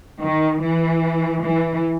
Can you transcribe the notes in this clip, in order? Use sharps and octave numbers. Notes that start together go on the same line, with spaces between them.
D#3
E3
E3